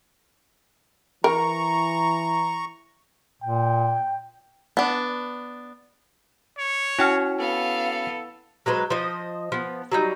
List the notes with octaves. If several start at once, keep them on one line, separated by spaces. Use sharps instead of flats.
E3 A#4 A#5 C#6
A#2 G5
B3 D4
C#5
C#4 E4 F#4 G5 F6
B3 A4 F5
F#3 G#3 B4 C5
F3 C5 D#5
F3 B3
F#3 G3 D#4